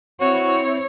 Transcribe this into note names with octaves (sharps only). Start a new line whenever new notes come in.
C4 E4 F#4 C#5